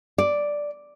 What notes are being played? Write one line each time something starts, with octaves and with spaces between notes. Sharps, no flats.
D5